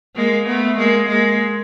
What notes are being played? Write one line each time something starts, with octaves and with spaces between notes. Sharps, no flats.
G#3 A#3
A3 B3
G#3 A#3
G#3 A#3